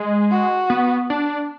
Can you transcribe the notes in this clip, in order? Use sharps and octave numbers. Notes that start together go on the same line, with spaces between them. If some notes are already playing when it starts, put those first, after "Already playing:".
Already playing: G#3
F#4
B3
D4